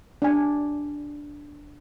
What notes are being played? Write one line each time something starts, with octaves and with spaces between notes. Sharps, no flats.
D4 G#5